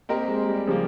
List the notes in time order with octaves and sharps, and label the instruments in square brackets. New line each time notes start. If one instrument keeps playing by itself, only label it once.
[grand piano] A#3 [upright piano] C4 G4 A#4 D#5
[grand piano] G#3
G3
[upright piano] C#3 G3 A#3 [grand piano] F3